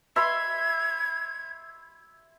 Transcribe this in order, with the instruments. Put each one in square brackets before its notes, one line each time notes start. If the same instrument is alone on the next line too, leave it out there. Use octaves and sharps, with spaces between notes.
[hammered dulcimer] E5 B5 C6 [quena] G#6